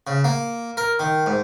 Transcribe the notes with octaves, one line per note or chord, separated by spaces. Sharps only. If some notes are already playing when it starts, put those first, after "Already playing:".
C#3
A#3
A#4
D#3
G#2